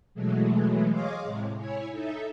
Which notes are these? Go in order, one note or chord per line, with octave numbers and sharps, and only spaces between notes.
B2 E3 F#3 G#3 A3
G#4 C#5 D#5 F5 C6 D6
A2 C3 G#3
E4 C#5 G#5
D#4 A4 E5